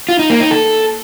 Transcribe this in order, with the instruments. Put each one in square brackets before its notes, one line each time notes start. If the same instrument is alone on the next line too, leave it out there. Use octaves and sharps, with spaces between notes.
[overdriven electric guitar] F4
D#4
A#3
D#4
A4